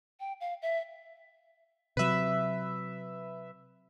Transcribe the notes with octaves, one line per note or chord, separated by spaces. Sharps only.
G5
F5
E5
C3 F#3 B4 E5